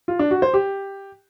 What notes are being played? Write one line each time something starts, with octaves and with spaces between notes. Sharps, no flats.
F4
D4
F#4
C5
G4